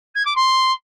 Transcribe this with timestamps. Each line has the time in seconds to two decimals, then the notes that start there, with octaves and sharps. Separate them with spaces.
0.15 G#6
0.25 D6
0.36 C6